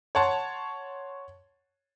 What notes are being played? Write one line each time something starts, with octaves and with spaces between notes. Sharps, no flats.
C#5 F#5 A5 C6